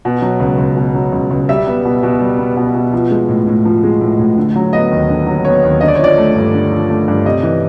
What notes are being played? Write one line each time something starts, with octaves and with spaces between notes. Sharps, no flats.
B2
F#3
C#2
C#2
B2
F#3
C#2
C#2
G3 E5
B3
B2
B2
G3
B3
B2
B2
F3
G#3
A2
A2
F3
G#3
A2
A2
D3
F#3
B3 D#5
D#2
D3
F#3
B3 C#5
D#2
D3 D#5
D5
C#5
F3 D5
A3
G2
D3
F3
A3
G2
C3 D#5
E3